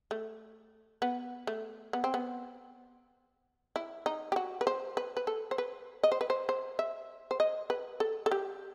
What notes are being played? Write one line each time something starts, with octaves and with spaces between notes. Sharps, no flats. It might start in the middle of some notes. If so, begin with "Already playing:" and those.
A3
B3
A3
B3
C4
B3
E4
D#4
G4
F#4
B4
C5
B4
B4
A4
C5
B4
D#5
C5
B4
C5
C5
E5
C5
D#5
B4
A4
A4
G4